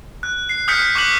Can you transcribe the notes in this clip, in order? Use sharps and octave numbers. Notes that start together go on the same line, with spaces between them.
F#6
C7
D#6 F6 G6 B6 C#7
C#6 D6 F#6 B6 F#7